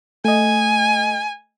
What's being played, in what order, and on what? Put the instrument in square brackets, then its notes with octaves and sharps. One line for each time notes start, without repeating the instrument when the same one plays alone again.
[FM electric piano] A3 D#5 [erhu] G#5